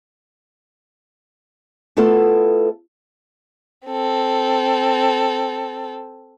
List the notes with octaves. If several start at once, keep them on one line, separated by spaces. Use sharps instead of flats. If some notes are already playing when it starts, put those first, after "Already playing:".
A3 B3 E4 F4 A4
C4 A4